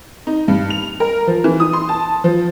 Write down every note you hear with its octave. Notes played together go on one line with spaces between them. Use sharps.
D#4
G2
F7
A#4
F3
E3
D#6
C6
A5
F3